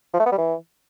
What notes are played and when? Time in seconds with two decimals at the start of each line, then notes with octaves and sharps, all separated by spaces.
0.13 F3
0.20 A3
0.26 B3
0.32 G3
0.38 E3